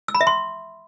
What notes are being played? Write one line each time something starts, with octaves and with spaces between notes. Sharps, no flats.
E6
B5
E5
C6